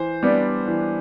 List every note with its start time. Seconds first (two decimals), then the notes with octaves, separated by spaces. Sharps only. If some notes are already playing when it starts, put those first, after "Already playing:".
Already playing: E3 C5
0.23 G3 B3 D4
0.68 E3